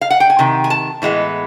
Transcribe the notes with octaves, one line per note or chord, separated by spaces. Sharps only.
F5
F#5
G5
G#5
C3 D#3
G#5
A5
A2 E3 G#3 B3